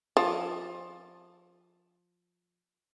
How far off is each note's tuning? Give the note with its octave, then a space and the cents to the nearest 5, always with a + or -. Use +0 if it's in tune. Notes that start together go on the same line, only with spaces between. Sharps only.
F3 +15